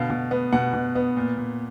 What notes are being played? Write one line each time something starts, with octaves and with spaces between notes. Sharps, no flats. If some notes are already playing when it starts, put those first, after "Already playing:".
Already playing: B2 D3 F5
B2
B3
B2 F#5
B2
B3
A#2
A#2